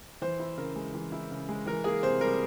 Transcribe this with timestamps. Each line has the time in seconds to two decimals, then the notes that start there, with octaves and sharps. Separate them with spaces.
0.22 E3 C5
0.39 E4
0.57 C#3 A#4
0.76 G#3
0.94 E3
1.12 E4
1.31 C#3
1.49 G#3
1.66 E3 A#4
1.84 A#3 G#4
2.03 C3 C5
2.21 G3 A#4